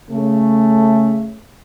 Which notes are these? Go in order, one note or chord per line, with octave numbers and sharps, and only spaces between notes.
C#3 A3